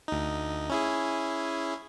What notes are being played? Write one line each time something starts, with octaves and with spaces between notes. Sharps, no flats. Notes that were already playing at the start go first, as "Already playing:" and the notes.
D2 D#4
C#4 E4 G#4